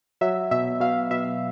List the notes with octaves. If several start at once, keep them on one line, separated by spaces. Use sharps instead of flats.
F#3 E5
B2 E5
B2 F5
B2 E5